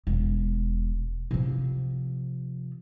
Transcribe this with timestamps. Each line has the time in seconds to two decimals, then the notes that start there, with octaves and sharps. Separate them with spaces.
0.07 E1
1.31 C3 F3